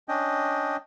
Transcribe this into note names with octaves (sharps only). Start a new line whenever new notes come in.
C#4 D4 D#5 G5